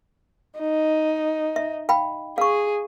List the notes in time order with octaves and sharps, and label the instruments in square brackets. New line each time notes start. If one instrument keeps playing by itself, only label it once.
[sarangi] D#4
[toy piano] E5
F5 G5 B5
[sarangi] G#4 [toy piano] F5 C#6